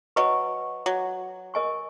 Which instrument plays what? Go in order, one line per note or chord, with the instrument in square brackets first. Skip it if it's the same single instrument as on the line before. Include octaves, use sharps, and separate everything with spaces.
[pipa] F#3 [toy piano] B4 D#5 G#5 C#6
[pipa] F#3
[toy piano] A#4 D#5 G#5 C#6